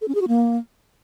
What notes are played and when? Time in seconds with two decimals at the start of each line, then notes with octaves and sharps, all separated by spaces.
0.01 A4
0.08 C#4
0.15 G#4
0.21 F#4
0.28 A#3